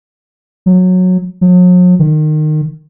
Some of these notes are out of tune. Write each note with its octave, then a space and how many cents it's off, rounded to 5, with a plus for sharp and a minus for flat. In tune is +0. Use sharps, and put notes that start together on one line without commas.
F#3 -15
F#3 -45
D#3 -25